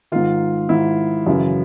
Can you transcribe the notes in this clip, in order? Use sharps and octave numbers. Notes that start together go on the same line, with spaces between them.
G#2 D#3 F4
G#2 D#3 E4
F#2 C#3 E3